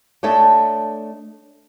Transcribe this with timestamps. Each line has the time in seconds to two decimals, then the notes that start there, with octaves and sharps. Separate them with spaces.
0.23 A3 D4 C#5 D#5 E5 A5